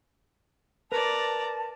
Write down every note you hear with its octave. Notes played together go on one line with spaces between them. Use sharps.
A#4 B4 D5 A5 A#5